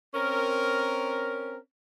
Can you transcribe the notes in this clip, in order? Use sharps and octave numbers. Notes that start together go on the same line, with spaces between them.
C4 C#4 A#4